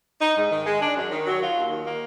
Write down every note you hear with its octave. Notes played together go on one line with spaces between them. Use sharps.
D#4
G#2
D#3
G#3
D4
F#2
D#3
F#3
F4
D#2
D#3
A#3